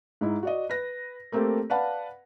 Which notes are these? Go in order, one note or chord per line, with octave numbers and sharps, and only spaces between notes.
G#2 D#4 E4
F#4 D5 D#5
B4 A#6
A3 A#3 C4 G4 A4
B4 D5 F5 F#5 A5 B5